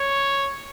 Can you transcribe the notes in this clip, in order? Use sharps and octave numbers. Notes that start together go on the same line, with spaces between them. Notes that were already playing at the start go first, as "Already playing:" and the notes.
Already playing: C#5